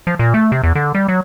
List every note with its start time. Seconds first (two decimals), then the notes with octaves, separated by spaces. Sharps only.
0.07 F3
0.19 A#2
0.34 A3
0.52 C3
0.63 E2
0.75 D3
0.95 G3
1.08 F#3